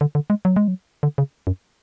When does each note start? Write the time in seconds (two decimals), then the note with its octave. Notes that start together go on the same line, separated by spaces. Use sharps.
0.01 D3
0.15 D3
0.30 G#3
0.45 F#3
0.56 G#3
0.68 F#3
1.03 D3
1.18 C#3
1.47 F#2